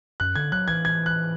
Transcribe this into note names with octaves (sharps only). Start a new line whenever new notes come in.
F#2 F#6
D3 G#6
F#3 F#6
E3 G#6
G#6
F#6